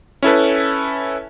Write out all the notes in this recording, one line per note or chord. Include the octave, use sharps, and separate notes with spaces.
C#4 E4 A4 B4